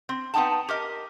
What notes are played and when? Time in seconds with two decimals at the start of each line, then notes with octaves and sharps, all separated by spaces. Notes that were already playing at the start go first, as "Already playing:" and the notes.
0.09 C4
0.34 B3 C4 D#4 G5 A5
0.69 G4 A#4 D#5